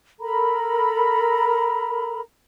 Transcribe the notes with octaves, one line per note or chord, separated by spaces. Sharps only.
A4 A#4 A#5 B5